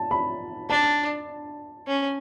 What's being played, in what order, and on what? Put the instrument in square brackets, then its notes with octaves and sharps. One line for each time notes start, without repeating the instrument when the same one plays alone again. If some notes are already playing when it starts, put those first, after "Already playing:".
Already playing: [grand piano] A5
B5
[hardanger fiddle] D4 [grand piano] A5
[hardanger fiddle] C#4